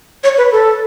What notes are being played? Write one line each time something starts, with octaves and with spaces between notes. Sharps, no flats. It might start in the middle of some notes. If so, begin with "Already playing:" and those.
C#5
B4
A4